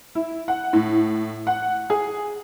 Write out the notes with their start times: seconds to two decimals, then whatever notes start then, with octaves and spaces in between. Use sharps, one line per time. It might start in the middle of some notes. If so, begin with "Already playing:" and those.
0.15 E4
0.48 F#5
0.73 A2
1.47 F#5
1.90 G#4